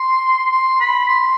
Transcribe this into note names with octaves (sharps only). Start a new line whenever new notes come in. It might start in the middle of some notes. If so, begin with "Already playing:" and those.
Already playing: C6
C6
B5
C6